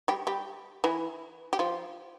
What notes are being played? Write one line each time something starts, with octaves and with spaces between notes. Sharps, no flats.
G3 G4
G3 G4
E3 E4
G4
F3 F4